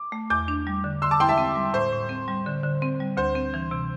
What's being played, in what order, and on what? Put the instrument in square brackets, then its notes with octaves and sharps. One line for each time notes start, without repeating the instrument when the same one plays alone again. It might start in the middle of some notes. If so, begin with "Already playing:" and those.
Already playing: [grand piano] D6
[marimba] A3
[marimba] E2 [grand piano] D6 G6
[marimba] D4
G3
D3
[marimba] D3 [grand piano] C6 E6
[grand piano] A5 D6
[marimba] E4 [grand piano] G5 C6
[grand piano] E5 A5
[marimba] C4
G3
[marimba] A2 [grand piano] C5
[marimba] A2
C4
G3
D3
D3
C4
G3
[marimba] D2 [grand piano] C5
[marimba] C4
E3
C3